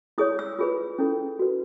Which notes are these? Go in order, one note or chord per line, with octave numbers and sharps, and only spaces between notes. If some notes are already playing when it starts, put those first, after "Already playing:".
E4 G#4 C#5 D#6
E6
F4 G#4 B4
C#4 E4 A4
F#4 B4